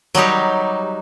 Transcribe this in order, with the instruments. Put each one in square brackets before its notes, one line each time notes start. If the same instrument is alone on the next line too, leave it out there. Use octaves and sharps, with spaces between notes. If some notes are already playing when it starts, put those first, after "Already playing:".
[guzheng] F#3 G3 D#4 G4